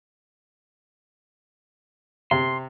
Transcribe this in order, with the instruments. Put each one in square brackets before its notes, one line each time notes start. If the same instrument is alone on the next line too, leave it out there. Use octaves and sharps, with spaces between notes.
[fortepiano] C3 [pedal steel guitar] C6